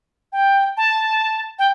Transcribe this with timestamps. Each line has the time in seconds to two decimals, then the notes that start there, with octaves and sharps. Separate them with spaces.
0.32 G5
0.77 A5
1.59 G5